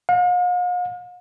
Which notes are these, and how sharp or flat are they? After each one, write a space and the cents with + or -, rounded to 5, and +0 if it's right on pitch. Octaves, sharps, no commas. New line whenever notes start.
F5 +45